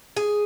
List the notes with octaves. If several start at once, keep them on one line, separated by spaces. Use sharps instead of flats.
G#4